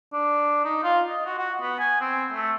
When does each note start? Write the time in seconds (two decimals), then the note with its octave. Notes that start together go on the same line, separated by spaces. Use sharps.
0.13 D4
0.64 D#4
0.83 F4
1.10 D#5
1.26 F#4
1.38 F#4
1.61 B3
1.79 G#5
2.01 C4
2.32 A3